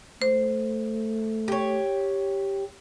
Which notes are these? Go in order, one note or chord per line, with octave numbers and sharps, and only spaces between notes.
A3 C5
G4 C#5